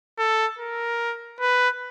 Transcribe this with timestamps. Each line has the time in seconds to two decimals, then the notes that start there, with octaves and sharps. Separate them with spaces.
0.18 A4
0.59 A#4
1.41 B4